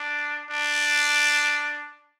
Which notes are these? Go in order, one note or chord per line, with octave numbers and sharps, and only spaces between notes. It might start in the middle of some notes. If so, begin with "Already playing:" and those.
Already playing: D4
D4